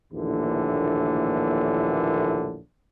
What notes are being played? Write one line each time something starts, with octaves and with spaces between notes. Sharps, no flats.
A#1 D#2 A2 D3 E3